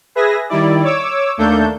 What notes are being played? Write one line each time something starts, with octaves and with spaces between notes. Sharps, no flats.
G#4 B4 E5 G#5 A#6
D#3 G3 E4 D5
C#5 D6 E6
D#2 A3 A#3 D4 A4 G6